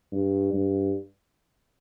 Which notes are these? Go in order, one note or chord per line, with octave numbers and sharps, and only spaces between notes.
G2
G2